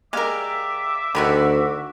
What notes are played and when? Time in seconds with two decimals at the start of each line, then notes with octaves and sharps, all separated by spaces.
0.13 G#3 G4 A#4 D5 E5 F5 D6
1.15 D2 D3 D#3 F#4 B5